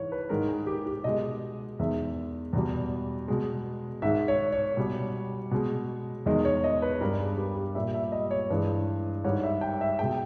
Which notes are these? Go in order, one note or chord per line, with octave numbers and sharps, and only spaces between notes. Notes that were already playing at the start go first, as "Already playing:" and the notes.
Already playing: G#2 E3 C#5
B4
G#2 D#3 G#3 A#4
G#4
G4
G4
B2 G#3 D#5
E2 D#3 G#3 E5
E2 B2 G3
B2 G#3
G#2 D#3 G#3 E5
C#5
C#5
B2 G3
B2 G#3
E2 D#3 G#3 D#5
C#5
D#5
B4
G2 G3 A#4
G#4
G4
G4
A#2 G3 E5
E5
D#5
C#5
G2 E3 G#3 B4
G#2 D#3 G3 C#5
E5
G5
E5
B2 G#3 G5